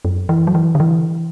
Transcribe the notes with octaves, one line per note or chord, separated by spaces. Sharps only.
F#2
E3
F#3
E3
D3
E3